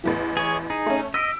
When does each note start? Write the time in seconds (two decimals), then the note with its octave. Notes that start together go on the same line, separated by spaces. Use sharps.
0.04 A1 E2 E3
0.37 G#4 C#5
0.70 D#4 G#4
0.86 A3 C#4
1.14 D#5 E6 B6 D7